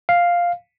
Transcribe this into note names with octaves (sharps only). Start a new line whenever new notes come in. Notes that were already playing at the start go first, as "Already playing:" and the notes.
F5